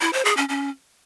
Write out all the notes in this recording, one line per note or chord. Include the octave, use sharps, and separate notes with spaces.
E4
C5
G#4
C#4
C#4